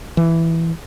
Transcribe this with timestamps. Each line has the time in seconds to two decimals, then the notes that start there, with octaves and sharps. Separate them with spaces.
0.17 E3